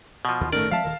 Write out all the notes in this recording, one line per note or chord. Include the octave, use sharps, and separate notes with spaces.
B2 F3
D#2 F4
G1 A2 D#3 A3 C#4 A#4 D5
F3 G#3 C4 E5 F5 A5
D#1 D#3 A#4